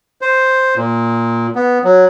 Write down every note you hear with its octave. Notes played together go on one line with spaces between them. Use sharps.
C5
A#2
B3
F#3